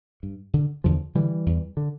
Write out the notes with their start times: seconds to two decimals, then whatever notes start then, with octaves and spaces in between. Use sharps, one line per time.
0.23 G2
0.54 D3
0.84 E2 D3 F3
1.15 D3 E3 G3
1.46 E2
1.77 D3